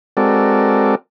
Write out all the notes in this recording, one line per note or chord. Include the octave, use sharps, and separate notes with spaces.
G#3 C4 F#4 A4 A#4 D5